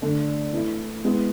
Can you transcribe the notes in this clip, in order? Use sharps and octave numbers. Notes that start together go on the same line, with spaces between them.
D3 A3 D4 A4
E3 A3 E4
G#3 B3 E4